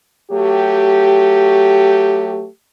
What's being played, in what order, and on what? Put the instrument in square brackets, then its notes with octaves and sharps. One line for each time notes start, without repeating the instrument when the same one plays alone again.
[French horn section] F#3 A3 G4